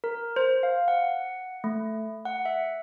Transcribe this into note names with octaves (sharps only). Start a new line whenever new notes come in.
A#4
C5
F5
F#5
A3
F#5
E5